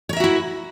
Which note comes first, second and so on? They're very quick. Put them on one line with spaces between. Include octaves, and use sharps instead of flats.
C#5 A#4 E5 F#4 E4